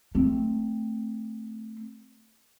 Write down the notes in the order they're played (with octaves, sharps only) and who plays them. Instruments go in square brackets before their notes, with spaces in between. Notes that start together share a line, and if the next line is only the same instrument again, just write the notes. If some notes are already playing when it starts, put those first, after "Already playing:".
[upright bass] A3 C4